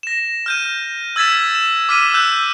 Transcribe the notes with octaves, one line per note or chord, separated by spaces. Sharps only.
A#6 E7
F6 G6 D#7
E6 G#6 A6 B6 E7
E7
D6 F6 B6 D#7
E6 F#6 G6